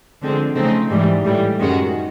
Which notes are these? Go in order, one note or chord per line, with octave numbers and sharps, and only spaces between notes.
D3 F3 G#3 C4
C#3 F3 A3 C4 D#4
G#2 E3 G3
A2 E3 G3
F#2 D#3 G#3 C#4 F#4